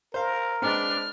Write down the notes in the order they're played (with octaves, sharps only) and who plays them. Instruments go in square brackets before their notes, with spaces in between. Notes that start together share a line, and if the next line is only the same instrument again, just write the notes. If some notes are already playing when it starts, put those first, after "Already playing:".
[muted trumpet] A#4 [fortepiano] C5 F5
[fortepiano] G#3 C4 [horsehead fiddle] D4 B4 [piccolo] F6